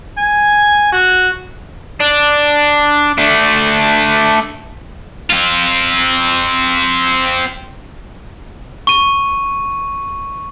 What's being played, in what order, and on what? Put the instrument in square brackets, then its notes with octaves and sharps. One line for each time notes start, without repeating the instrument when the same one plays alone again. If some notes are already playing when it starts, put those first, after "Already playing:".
[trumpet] G#5
F#4
[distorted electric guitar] D4
A3 D4
C4 F4
[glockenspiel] C#6 D#7